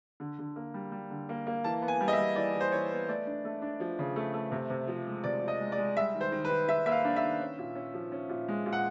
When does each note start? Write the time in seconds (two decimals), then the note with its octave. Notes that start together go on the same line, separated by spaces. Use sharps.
0.20 D3
0.39 D3
0.56 A#3
0.74 G3
0.92 G3
1.10 D3
1.29 A#3
1.47 A#3
1.64 E3 A5
1.82 B3
1.88 G#5
2.01 G3
2.08 D#5
2.13 E5
2.18 G3
2.36 E3 D5
2.55 E3
2.60 C5
2.72 E3 C#5
2.91 B3
3.08 A3 D5
3.27 D4
3.45 A3
3.62 D4
3.80 F3
3.99 C#3
4.16 A3
4.34 A3
4.52 C3
4.70 C3
4.88 F3
5.07 G#3
5.24 C3 D5
5.42 F3
5.48 D#5
5.60 G#3
5.72 D5
5.78 G#3
5.97 G3 E5
6.15 D#3
6.21 C5
6.32 D#3
6.45 B4
6.49 D#3
6.68 D#3 E5
6.86 A#3 E5
6.92 F5
7.05 D4
7.16 E5
7.23 D#3
7.40 C#4
7.59 A#2
7.75 C#4
7.94 F3
8.12 C#4
8.29 A#2
8.48 G#3
8.66 A#2
8.73 F#5